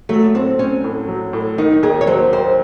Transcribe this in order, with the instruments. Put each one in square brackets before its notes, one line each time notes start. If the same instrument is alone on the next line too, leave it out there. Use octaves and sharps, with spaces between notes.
[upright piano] F#3 [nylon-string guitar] A3
[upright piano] A2 [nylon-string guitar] C4
[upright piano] C4 [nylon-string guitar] C#4
[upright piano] A2
F#3
A2
[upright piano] D#3 [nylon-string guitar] D#4
[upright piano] D#2 [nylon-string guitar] G#4
[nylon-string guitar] C#5
[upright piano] F#3 [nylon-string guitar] C5
[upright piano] D#2 [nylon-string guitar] C5